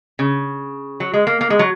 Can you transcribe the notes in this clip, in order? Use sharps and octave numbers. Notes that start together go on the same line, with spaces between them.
C#3
F#3
G#3
A#3
A#3
G#3
F#3